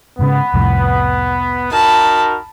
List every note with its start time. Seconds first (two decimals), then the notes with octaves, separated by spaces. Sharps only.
0.19 G#2 C#3 B3
0.54 C2 F2 A2
1.72 D#4 F#4 A#4 A5 B5